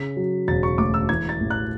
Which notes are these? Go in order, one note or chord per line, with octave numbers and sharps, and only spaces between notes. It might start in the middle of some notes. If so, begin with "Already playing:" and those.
Already playing: C#3 B6
F#3
E1 A6
C#6
D2 D6
E6
E3 G#6
A6
A1
F#6